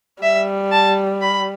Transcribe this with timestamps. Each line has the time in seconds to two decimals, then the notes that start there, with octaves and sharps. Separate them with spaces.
0.23 G3 E5
0.72 A5
1.22 B5